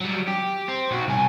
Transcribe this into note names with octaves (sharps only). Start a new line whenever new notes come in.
F#3 G3
G4
C4
B1 F#4
C2 G#5